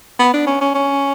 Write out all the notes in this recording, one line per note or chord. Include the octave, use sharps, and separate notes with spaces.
B3
D4
C#4
C#4
C#4